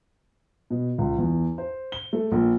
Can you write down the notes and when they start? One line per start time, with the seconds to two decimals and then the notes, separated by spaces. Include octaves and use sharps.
0.70 B2
0.98 C#2
1.18 E2
1.58 C5
1.92 G7
2.13 A3
2.32 A#1